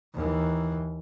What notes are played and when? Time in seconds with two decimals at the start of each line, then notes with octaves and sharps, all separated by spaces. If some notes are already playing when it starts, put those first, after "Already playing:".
0.14 D#2 E3